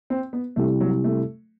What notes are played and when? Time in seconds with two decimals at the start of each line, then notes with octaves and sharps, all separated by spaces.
0.10 C4
0.33 B3
0.56 C3 G3 A3 C4 E4 G4
0.80 F#3
1.04 A3